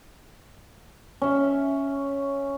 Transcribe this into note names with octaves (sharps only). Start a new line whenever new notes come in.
C#4 E5